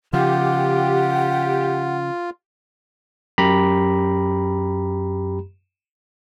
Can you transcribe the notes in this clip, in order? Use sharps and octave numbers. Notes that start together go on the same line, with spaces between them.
C#3 F3 F4 G4 F#5
F#2 G4 A#5 B5